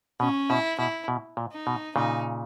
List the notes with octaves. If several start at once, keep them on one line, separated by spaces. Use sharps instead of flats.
B2 C#4
B2 E4
B2 E4
B2
A#2
D#4
B2
A#2 C#3 D#4